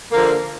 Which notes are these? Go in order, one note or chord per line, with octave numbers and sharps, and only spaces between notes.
D3 F3 A#3